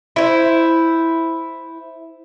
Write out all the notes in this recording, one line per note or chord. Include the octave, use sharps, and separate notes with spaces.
E4 C5